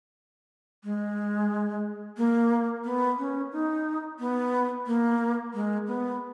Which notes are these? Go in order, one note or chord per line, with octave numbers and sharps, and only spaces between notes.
G#3
A#3
B3
C#4
D#4
B3
A#3
G#3
B3